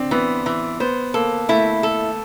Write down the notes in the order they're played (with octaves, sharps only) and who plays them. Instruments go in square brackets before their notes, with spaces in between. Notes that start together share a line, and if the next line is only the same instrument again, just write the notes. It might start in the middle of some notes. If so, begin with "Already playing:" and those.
Already playing: [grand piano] C4 D4
[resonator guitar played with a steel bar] E3 [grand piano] B3
[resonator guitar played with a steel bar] E3
[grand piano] B3 [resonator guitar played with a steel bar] C5
[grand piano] A#3 [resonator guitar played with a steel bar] A4
[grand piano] A3 [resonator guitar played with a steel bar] E4
[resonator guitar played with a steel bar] A4